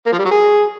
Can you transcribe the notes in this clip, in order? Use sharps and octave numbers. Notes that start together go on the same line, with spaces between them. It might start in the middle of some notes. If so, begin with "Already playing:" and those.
A#3
F3
G3
F#3
G#4